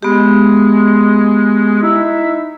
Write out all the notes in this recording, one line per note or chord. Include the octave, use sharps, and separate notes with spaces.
G#3 B3 G4
D#4 E4 E5